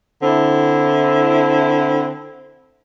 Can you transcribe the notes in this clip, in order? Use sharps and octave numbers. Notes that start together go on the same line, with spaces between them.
D3 C4 E4